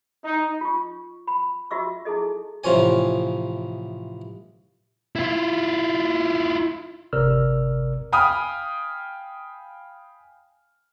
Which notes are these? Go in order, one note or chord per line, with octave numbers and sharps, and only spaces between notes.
D#4
F4 C#6
B5
F4 F#4 D#5 E5 C#6 E6
D#4 E4 G#4 A4 D#5
A1 C3 F3 F4 C#5 G#5
E4 F4
G1 C3 A#4 D5 E6 F6
F5 G5 G#5 B5 D#6 F6